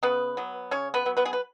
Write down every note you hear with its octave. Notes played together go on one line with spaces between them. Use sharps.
C#3 B3 B4
F#3 B3
C#3 C#4 C#5
B3 B4
F#3 B3
B3 B4
G#4
B4